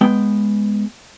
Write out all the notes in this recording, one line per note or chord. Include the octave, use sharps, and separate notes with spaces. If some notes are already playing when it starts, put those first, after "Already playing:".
G#3 B3 G5